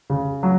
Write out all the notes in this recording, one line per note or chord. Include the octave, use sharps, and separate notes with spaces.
C#3
F#3